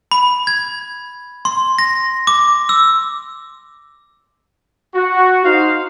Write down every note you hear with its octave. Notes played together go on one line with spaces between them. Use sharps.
B5
G#6
C6
A#6
D6
E6
F#4
D#4 C5 F5